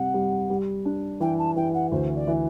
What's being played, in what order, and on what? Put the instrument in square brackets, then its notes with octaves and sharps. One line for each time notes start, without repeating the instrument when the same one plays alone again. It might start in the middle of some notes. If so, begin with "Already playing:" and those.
Already playing: [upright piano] C3 G3 [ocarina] F#5
[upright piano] G3
G3
D4
[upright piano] E3 [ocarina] G5
[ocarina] A5
[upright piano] E3 [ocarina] G5
[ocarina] F#5
[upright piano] D2 [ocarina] C5
[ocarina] D5
[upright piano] E3